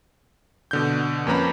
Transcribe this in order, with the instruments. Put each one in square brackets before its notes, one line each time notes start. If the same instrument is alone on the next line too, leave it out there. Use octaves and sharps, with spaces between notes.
[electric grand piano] B2 D3 G6
F2 A#3 C#4 B4 A#5 B5